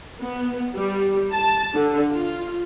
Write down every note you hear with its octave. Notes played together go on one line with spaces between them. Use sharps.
B3
G3
A5
D3
F4